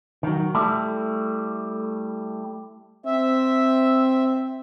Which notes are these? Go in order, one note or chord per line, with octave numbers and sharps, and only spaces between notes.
D#3 F#3
G3 A3 E4
C4 E5